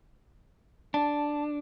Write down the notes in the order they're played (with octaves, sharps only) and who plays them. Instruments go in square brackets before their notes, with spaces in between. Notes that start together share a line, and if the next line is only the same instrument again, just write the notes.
[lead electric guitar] D4 [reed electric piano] A5